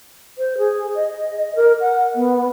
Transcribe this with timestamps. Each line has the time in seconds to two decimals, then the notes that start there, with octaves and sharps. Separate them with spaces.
0.38 C5
0.58 G#4
0.95 D#5
1.55 A#4
1.81 F#5
2.15 B3